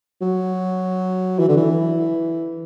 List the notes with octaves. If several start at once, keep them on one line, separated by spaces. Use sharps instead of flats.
F#3
E3
D3
E3